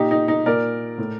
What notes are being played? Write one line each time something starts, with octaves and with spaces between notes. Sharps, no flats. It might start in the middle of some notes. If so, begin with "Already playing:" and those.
Already playing: A#2 D#4 G4
D#4
D#4
A#2 A#4 D5
A2